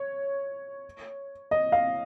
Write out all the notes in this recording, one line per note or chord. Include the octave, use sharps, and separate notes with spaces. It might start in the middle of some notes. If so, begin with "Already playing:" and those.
Already playing: C#5
D#5
F5